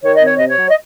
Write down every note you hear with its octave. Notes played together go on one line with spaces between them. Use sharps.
D#3 C#5
D#5
C4 C#5
C3 D#5
C#5
F#3
D#5